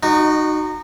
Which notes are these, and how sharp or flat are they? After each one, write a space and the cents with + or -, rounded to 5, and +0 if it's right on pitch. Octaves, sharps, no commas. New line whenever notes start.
D#4 -20 F#4 +0 D#5 -45